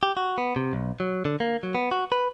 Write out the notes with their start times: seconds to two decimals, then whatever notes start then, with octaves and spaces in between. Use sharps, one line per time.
0.03 G4
0.17 F#4
0.38 B3
0.56 C3
0.73 B1
1.00 F#3
1.25 D3
1.40 A#3
1.63 F#3
1.75 B3
1.91 F#4
2.12 B4